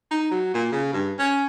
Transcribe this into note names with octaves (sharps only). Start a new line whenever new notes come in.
D#4
F#3
A#2
C#3
G2
C#4